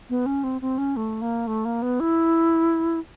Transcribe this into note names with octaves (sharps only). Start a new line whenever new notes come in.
B3
C#4
C4
C4
C#4
A3
A#3
A3
A#3
B3
E4